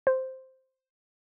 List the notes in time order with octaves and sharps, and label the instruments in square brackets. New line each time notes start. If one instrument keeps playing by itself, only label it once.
[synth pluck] C5